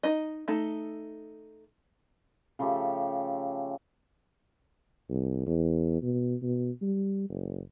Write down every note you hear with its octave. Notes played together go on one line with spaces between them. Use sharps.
D#4 D#5
A3 D#4 A4
C#3 F3 A3 G4
C2
E2
B2
B2
G3
F#1